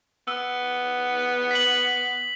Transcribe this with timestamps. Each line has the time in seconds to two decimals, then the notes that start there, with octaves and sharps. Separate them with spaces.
0.28 B3 E6
1.51 B6 F#7